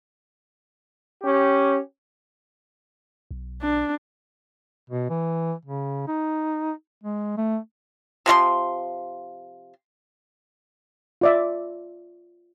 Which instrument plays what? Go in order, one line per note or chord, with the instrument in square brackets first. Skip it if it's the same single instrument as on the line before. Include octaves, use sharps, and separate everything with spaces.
[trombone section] C#4 G4
[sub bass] B1
[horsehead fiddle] D4
[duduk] B2
E3
C#3
D#4
G#3
A3
[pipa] C3 F3 F4 C6
[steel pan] F4 D5 E5